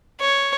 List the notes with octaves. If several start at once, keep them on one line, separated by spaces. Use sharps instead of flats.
C#5